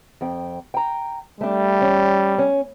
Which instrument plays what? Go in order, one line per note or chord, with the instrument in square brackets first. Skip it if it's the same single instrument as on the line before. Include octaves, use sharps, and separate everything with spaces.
[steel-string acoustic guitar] F2 G5
G5 A#5
[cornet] G3 [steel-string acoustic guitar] A3 D4
[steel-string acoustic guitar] C#4
C#4